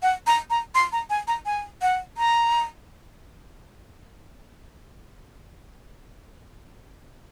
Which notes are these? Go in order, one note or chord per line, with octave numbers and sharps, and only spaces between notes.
F#5
A#5
A#5
C6
A#5
G#5
A#5
G#5
F#5
A#5